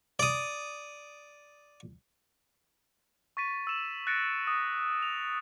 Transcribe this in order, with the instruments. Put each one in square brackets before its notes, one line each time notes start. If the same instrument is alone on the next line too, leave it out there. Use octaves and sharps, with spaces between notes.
[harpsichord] D5 D#6
[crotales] C#6 A6 B6 D#7
E6 E7
F#6 A6 A#6 C#7 D7
D#6
F7